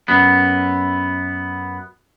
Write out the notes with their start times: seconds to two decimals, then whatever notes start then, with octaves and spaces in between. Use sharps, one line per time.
0.08 F#2 B3